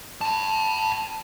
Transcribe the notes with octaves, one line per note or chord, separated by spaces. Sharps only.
G5 A5